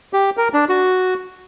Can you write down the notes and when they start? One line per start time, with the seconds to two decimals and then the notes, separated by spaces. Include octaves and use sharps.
0.13 G4
0.37 A#4
0.54 D4
0.69 F#4